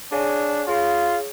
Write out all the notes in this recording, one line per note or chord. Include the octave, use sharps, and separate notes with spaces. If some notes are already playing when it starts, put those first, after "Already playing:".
D4 G#4 C#5 F5 G#5
F4 G#4 C#5 F5